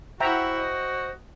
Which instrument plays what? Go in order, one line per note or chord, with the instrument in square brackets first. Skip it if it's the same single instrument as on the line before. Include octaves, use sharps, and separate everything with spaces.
[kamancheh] E4 F#5 [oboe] F#4 [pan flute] C5 [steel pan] E5 G5 A#5
[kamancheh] D#5